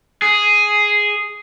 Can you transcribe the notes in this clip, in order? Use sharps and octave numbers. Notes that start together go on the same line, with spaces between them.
G#4